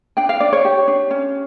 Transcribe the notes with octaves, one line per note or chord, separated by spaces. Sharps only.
D4 G5
F5
D4 D5
C#5
G4
D4
C#4